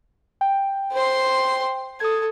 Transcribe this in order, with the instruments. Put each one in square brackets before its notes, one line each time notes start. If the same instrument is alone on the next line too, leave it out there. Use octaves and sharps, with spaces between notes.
[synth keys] G5
[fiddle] C5 C6
[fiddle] A4 [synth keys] D#6 G#6